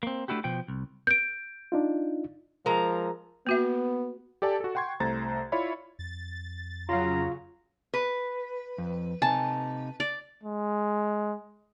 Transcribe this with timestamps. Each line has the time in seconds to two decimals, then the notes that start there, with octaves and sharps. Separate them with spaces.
0.03 A#3 C4
0.28 A3 D4 E4 F#4 G4
0.44 B2 F3 G5
0.68 C2
1.07 G6 D7
1.72 D4 D#4 F4
2.66 F3 G#3 A#4 A#5
3.47 A#3 B3 F#4 E5
4.42 G4 A4 D5 G#5 A5
4.60 F#4 A4
4.75 F#5 G5 C6 C#6 G#6
5.00 C2 A3 C5 A#5 A6
5.52 E4 F4 C#5 D5 E5 B5
5.99 F2 A6
6.89 C#3 F#3 F4 F5 A#5
7.94 B4
8.78 F2
9.22 C3 D#4 G#5 A5
10.00 D5
10.43 G#3